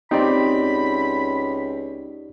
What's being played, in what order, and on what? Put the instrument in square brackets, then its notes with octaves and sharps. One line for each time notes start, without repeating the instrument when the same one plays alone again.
[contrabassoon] C#2 [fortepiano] C4 [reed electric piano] D#4 G4 D5 [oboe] B5